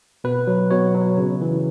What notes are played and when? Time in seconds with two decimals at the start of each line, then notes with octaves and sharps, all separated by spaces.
0.24 B2 B4
0.47 F#3
0.71 B2 C#5
0.95 F#3
1.18 C#3
1.42 E3